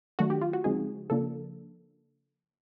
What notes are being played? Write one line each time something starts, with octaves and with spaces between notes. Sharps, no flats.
D#3 F#3 A3 D4 F#4
G4
F4
F#4
C#3 F3 G#3 C4 D#4 G#4
C#3 F3 A#3 D4 A4